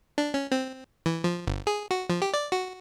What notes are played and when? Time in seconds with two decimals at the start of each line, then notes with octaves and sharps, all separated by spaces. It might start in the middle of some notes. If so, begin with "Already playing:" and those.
0.18 D4
0.34 C#4
0.52 C4
1.06 E3
1.24 F3
1.47 G1
1.67 G#4
1.91 F#4
2.10 F3
2.22 G4
2.34 D5
2.52 F#4